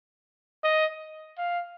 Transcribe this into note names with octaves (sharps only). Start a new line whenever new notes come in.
D#5
F5